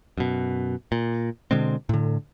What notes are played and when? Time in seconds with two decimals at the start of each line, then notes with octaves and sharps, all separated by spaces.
0.18 F#2 B2
0.92 A#2
1.51 B2 D3 G#3 C4
1.89 A2 D3